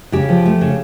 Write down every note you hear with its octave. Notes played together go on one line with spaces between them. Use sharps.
C#3 G4
F3
A3
C#3